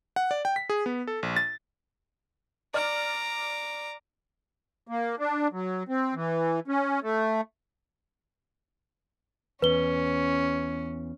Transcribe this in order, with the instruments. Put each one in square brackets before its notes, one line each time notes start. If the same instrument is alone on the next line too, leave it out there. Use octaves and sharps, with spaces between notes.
[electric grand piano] F#5
D5
G5
B6
G#4
B3
A4
A#1
A6
[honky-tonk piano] D5 F6 [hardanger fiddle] A#5 D6
[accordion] A#3
D4
F#3
C4
E3
C#4
A3
[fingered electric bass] E2 [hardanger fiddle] C#4 [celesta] B4 G7